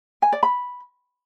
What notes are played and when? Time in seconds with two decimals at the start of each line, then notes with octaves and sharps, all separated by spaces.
0.22 G#5
0.32 D5
0.43 B5